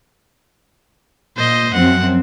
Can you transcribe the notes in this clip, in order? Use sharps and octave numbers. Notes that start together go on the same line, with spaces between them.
A#2 C5 D#5
F#2 F3 C4 F#5